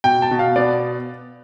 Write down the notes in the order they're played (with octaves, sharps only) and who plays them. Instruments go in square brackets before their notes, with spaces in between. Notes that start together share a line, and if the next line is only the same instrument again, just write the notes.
[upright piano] B2 G5
A5
B2
F5
B3 D5